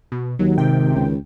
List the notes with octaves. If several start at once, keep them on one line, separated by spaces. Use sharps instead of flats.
B2
D#2 D#3 F#3
G#1 C3 G5
C#2